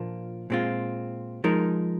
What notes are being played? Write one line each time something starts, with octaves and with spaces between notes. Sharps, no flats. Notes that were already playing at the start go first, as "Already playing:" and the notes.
Already playing: A#2 F3 A#3 D4 F4
A#2 G#3 C4 F4
F3 G#3 D#4 A#4